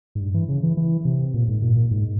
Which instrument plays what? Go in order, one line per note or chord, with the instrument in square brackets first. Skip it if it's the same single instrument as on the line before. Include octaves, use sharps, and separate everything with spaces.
[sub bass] G#2
G2
E3
C#3
E3
E3
C3
A#2
G#2
A#2
A#2
G#2